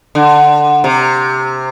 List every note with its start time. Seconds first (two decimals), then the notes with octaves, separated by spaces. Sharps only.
0.15 D3
0.84 C3